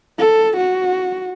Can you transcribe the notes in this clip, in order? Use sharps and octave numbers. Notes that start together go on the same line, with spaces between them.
A4
F#4